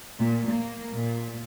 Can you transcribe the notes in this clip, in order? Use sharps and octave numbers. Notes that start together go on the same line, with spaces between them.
A#2
A#3
A#2